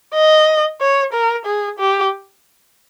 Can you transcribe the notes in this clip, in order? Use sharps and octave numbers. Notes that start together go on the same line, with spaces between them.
D#5
C#5
A#4
G#4
G4